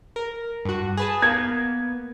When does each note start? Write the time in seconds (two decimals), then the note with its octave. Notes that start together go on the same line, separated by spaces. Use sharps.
0.16 A#4
0.65 G2 F#4
0.97 G#4 B4 A5
1.22 A#3 B3 G#6